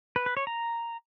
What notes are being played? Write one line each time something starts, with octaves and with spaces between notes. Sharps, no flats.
B4
B4
C#5
A#5